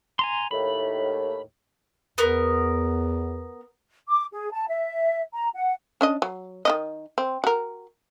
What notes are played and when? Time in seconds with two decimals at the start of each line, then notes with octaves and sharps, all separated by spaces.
0.19 G#5 A#5 C6
0.51 D#2 A2 B5
2.18 E2 B3 A#4
4.08 D6
4.33 G#4
4.52 A5
4.68 E5
5.33 A#5
5.55 F#5
6.01 C#4 D4 D#5
6.22 F#3
6.65 D#3 C#4 D#5
7.18 C4
7.44 F#4 A#4